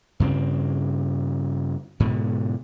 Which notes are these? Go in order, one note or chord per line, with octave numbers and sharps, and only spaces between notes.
G2 C#3 C4
G#2 B2 D3